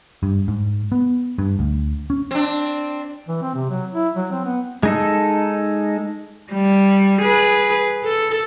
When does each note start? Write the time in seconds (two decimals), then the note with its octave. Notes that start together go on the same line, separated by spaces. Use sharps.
0.23 G2
0.48 G#2
0.92 B3
1.39 G2
1.59 D2
2.10 C#4
2.31 C4 D4
3.28 E3
3.42 C4
3.55 C3
3.70 F#3
3.93 E4
4.15 F#3
4.32 C4
4.45 B3
4.83 G#3 D#4 A4
6.52 G3
7.22 G#4 B4
8.04 A4